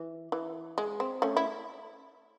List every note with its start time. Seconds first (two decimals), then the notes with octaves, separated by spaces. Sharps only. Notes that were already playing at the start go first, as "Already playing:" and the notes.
Already playing: E3
0.32 E3
0.78 G#3
1.00 C4
1.22 A3 C#4
1.37 E4